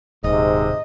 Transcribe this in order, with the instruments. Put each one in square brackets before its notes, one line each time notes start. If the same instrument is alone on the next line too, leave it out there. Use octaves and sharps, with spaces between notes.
[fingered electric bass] D#1 [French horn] G#2 [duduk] C3 [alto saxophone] D#5